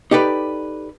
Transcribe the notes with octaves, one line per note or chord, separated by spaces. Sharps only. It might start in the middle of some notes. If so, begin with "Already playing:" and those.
D#4 G4 A4 B4 D5